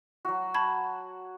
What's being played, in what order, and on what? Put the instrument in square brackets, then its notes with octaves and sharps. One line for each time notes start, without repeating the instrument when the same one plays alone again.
[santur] F#3 F#4
[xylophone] A5 B5 G#6